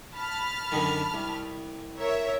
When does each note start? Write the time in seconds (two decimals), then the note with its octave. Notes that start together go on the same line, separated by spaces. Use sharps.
0.14 A5 B5 F6
0.72 F#2 D3 D#3
1.14 C2
1.99 A#4 C#5 E5